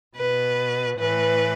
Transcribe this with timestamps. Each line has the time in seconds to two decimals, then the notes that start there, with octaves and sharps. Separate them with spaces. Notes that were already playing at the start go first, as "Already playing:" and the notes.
0.16 B2 B4
0.99 A2 E3 B4